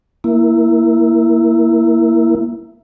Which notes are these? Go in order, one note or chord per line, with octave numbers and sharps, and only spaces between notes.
A#3 E4